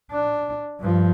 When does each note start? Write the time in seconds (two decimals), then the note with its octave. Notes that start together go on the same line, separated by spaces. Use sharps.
0.12 D4
0.80 G2 F3